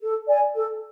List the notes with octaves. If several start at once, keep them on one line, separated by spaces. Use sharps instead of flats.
A4
D5 G#5
A4